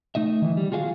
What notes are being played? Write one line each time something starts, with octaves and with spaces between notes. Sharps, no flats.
A3 D#4 D#5 E5
D#3 E3
G3
F4 F#4 G#4 D#5 F5